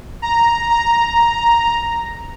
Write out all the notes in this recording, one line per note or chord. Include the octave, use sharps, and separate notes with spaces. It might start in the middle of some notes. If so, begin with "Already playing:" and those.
A#5
A#5